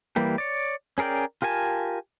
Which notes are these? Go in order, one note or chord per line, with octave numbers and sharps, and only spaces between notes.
E3 G3 A#3 G4
C#5 D5
C#4 G#4 A#4 D5 G5
F4 G4 A#4 G#5 A5